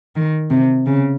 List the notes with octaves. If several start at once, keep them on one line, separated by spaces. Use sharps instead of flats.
D#3
C3
C#3